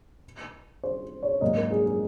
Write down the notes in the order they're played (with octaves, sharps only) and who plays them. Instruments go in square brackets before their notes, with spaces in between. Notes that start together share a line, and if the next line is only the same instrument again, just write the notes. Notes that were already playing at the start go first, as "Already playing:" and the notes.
[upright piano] C5
C#5
[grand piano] G#2 F#3 A#3 [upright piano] D#5
[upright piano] A#4
G#4
G#4